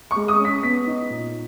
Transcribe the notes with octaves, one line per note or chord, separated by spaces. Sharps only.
C#6
G#3
D#6
C#4
B6
B3 B6
D#4
A#2